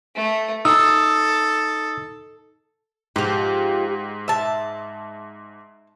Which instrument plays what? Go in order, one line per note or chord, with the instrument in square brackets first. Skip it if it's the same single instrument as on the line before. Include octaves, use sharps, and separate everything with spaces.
[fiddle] A3
[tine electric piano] D#4 D#6 E6 [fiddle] A4
[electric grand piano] G#2 [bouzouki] F3 G4
[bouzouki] E5 A5